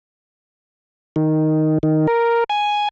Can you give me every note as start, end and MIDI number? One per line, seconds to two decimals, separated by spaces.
1.16 1.78 51
1.83 2.07 51
2.07 2.44 70
2.50 2.88 80